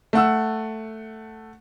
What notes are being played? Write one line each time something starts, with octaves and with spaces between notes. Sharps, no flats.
A3 F#5 E6